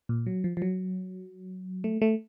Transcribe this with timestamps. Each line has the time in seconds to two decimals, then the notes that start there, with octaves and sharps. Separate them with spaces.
0.09 A#2
0.26 F#3
0.44 F3
0.57 F3
0.62 F#3
1.84 A3
2.02 A3